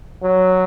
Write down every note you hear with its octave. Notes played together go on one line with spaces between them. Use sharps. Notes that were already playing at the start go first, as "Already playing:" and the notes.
F#3